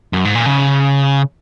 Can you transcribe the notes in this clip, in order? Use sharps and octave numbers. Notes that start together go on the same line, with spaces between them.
F#2
G#2
A#2
C#3